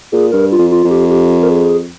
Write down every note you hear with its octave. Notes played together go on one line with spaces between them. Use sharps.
A#2 G#4
G2 A#4
F4
F2
F4
F2
G4
G4
A#4
G#4